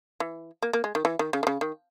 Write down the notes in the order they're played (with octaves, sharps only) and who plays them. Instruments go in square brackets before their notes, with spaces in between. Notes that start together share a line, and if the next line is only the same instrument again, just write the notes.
[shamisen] E3
A#3
A#3
G#3
D#3
E3
D#3
C#3
D#3
C#3
D#3